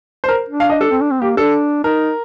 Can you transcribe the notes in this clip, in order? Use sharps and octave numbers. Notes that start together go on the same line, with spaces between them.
C5
A#4
D4
F5
D#5
A4
C4
D4
C4
A#3 G4
D4 A4
D#4 A#4